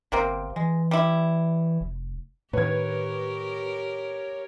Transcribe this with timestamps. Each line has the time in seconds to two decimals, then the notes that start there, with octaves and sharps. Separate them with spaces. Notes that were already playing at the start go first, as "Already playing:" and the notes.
0.12 G1 C3 A#3 C4
0.56 E3 G#3
0.91 G3 E4
1.81 F1
2.53 A2 D#3 G4 A#4 B4 C#5 G#6